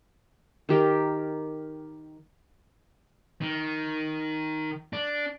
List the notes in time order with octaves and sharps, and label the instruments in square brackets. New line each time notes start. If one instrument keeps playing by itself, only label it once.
[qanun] D#3 G4 A#4
[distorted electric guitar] D#3
D4